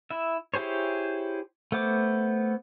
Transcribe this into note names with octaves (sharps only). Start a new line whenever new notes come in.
E4 E5
E4 G4 G#4 C5 C#5
A3 B3 C5 D6